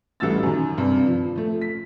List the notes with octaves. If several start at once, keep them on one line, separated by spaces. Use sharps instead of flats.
A1 G3 A3 F#4 E6 A6
F#2 D#3
G2 C3
F3
F3 A3
B6